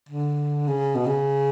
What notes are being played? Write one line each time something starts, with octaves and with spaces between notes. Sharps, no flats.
D3
C#3
B2
C#3